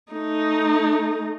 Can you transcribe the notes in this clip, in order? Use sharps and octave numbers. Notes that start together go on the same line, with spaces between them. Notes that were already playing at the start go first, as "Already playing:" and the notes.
A3 D#4